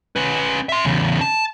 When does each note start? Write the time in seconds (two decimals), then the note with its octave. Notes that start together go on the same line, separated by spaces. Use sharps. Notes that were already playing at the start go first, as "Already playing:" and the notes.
0.16 C#4 B4
0.69 E5 C6
0.85 E2 C#3
1.21 A5